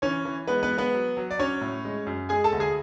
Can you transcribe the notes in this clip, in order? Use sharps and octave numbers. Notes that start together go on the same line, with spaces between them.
E3 C#4 C#5
E3
G#3 B3 B4
B3 B4
G#3
B3 B4
F#3
F#3
D5
F#3 C#4 C#5
A2
G#3
F#2
G#3 G#4 G#5
A4 A5
D2
G#4 G#5